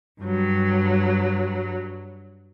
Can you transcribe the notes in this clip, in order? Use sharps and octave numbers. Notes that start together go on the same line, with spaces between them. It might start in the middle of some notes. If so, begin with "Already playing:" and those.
G2 F#3